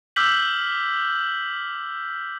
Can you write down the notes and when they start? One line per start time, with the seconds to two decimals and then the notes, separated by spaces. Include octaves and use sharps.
0.16 D6 E6 F6 G6 B6 F#7